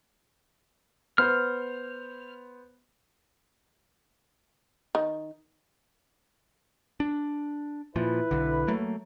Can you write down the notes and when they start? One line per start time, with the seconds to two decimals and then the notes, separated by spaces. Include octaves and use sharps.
1.18 B3 C5 F6
4.95 D#3
7.00 D4
7.96 A#2 F3 E4 B4
8.31 B1 D3
8.68 F#3 A3 A#3